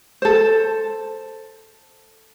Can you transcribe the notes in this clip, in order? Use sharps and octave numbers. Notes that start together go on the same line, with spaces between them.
A4 C5